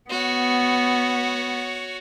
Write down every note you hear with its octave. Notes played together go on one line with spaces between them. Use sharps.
B3 F#4 C#5